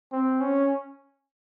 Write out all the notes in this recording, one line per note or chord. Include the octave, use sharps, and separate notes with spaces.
C4
C#4